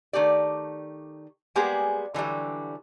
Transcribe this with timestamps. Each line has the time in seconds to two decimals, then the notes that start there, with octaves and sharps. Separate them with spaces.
0.13 D#3 A3 G4 D5
1.55 G3 G#3 A#3 B3 G4 G#4
2.14 D3 E3 F#3 G3